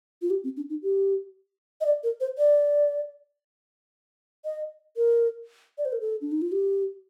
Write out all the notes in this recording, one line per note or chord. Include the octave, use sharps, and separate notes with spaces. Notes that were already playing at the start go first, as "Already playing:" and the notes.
F4
G4
C4
D4
D#4
G4
D#5
D5
A#4
C5
D5
D#5
A#4
D5
C5
A#4
A4
D4
D#4
F4
G4